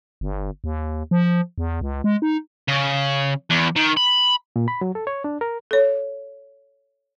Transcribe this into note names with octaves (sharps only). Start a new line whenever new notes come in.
G1
D#2
F3
E2
C#2
G#3
D#4
C#3
E2
D#3
B5
A#2
B5
F#3
A4
C#5
D4
A#4
A4 C#5